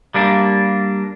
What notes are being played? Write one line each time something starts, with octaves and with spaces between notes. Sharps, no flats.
G3 A#3 D4